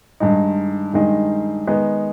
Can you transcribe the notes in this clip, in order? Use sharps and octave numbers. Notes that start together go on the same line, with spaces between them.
G2 D#3 G#3 D#4
G2 D#3 G#3 D#4
D#3 G#3 B3 D#4